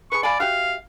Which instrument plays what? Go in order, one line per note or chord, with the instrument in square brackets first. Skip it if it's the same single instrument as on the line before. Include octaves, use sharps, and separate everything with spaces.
[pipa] G#4 B4 [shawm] C#6
[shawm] D5 [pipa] F5 G#5 B5
[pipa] F#4 G4 E5 [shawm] F5